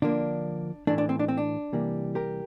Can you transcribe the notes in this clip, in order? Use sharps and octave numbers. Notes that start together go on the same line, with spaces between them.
D3 F3 A#3 D4
A2 E3 A3 D4
D4
C4
D4
C4
D4
C3 E3 G3 A#3
G4 A#4